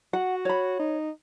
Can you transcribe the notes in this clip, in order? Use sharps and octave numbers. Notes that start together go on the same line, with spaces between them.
F#4 F#5
C#5 B5
D#4